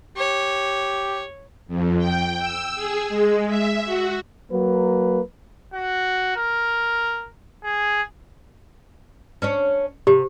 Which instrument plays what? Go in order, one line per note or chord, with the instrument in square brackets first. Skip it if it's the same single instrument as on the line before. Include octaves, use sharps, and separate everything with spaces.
[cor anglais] G4 [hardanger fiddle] C#5
[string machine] F2
G5
E6
G#4
G#3
E5
F#4
[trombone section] F#3 A#3 B4
[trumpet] F#4
A#4
G#4
[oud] C#4 D4 C#5
[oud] C3 [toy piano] G4